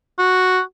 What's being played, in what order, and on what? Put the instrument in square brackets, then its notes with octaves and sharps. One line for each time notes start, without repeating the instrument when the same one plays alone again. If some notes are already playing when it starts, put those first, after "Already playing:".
[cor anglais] F#4